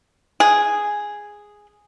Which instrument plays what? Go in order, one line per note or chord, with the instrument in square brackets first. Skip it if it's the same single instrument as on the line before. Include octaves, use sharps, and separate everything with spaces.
[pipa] G#4